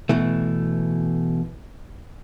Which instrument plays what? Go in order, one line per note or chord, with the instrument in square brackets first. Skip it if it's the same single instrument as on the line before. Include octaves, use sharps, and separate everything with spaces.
[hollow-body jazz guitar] B2 E3 A3